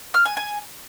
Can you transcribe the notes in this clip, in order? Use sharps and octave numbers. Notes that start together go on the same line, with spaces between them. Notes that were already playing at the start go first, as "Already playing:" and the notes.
F6
G#5
G#5